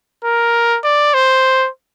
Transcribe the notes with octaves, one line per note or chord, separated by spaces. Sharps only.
A#4
D5
C5